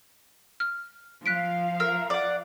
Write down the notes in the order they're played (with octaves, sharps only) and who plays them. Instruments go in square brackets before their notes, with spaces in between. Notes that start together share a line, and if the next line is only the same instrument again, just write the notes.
[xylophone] F6
[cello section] F3 F5 [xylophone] F#6 B6 D7
[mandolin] A#4 [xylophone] E6
[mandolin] D5 F#5